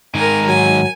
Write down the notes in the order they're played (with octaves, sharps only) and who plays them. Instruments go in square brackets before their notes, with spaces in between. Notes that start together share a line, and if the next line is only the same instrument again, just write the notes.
[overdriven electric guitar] G#2 D#3 [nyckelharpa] A#4 G#5
[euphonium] F#3 [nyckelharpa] G#5